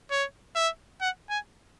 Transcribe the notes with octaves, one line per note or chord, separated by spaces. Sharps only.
C#5
E5
F#5
G#5